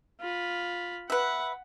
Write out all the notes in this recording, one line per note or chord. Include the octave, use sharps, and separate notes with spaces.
F4 B5
B4 E5 F#5